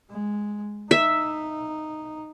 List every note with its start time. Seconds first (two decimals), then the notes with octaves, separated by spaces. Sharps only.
0.10 G#3
0.91 D#4 E5